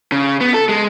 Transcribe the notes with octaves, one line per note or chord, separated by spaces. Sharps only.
C#3
B3
A4
G#3